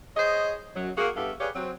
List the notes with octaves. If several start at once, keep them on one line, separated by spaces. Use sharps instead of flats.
G#4 C5 C#5 D#5
F#2 F#3
A#3 F#4 G#4
G2 B3 G4 A4 E5 F5
G4 G#4 B4 C#5 D5 F5
F#3 C4